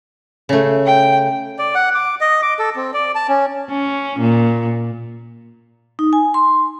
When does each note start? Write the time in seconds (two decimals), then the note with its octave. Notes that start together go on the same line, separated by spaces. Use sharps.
0.49 C#3 A3
0.86 G5
1.59 D5
1.75 F#5
1.95 D6
2.21 D#5
2.42 D6
2.59 A4
2.76 C4
2.94 D5
3.15 A5
3.28 C#4
3.69 C#4
4.19 A#2
5.99 D#4
6.13 G#5
6.34 C6